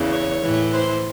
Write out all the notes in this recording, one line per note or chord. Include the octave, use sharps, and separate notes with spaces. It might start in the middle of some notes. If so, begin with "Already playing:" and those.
Already playing: E2 C#3 E3
C#5
A2 E3
C5